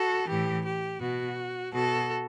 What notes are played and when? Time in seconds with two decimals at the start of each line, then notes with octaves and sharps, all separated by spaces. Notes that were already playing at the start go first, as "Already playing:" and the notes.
Already playing: F#4 A4
0.28 A2 E3 G4
0.64 G4
1.00 B2 F#4
1.74 B2 F#4 A4